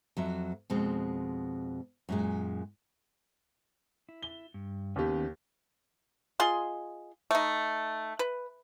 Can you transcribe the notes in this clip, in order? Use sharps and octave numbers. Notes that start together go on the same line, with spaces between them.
F2 F#3 E5
F2 B2 G#3 C4
F#2 A#2 G#3
E4
G7
G2
D#2 D#3 B3 C#4 G4
F4 G#4 D#5 C6
A3 D#4
B4